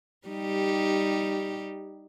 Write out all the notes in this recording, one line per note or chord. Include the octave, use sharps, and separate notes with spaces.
G3 D#4 G4